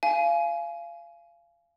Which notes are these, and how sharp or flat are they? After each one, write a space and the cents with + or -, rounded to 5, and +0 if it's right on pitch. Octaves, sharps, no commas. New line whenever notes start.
F5 -25 G#5 +20